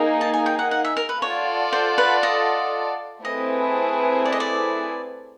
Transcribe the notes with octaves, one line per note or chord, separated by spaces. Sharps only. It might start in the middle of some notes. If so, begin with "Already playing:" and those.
Already playing: A#3 D#4 G#4
A5
G#5
G5
F#5
F#5
E5
A#4
B4
F4 A4 C#5 D5 F#5 A5
C5
B4
D#5
A3 C4 E4 G#4 B4 D#5
D5
D#5
D5